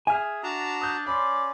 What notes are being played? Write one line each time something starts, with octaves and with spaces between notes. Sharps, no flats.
G#4 E5 G#5 F6
D4 F#4 A5 A#5
D#6 G6
C#4 D5 B5 C6